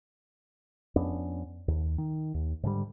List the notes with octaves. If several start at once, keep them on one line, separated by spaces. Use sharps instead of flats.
F2 B3 C#4 D4
D#2
D#3
D#2
G#2 D3 G3